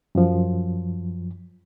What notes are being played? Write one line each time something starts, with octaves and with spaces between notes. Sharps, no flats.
F#2 F3